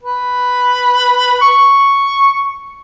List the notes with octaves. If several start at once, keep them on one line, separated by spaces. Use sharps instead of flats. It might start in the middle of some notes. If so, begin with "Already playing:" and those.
B4
C#6